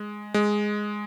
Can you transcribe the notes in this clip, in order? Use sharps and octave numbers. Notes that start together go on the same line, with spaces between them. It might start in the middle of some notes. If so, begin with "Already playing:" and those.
Already playing: G#3
G#3